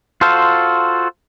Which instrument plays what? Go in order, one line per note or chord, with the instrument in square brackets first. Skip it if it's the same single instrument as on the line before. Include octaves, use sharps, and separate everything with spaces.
[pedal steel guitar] F4 F#4 A4 C5 F5